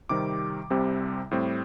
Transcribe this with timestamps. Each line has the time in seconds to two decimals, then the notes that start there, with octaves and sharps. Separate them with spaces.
0.09 C3 D#3 G3 C4 D6
0.70 C2 C3 G3 C4
1.31 A2 G3 C4